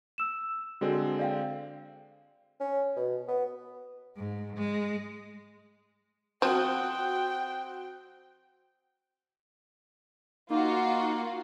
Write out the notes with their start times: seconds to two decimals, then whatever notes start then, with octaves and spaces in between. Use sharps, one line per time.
0.18 E6 E7
0.81 D3 G#3 C4 F#4 A4 D5
1.19 D5 F5 G5
2.60 C#4
2.96 B2
3.28 B3
4.17 G#2
4.56 G#3
6.42 F3 C4 F#4 C5 G5 D#6
10.50 A#3 D#4 F4 F#4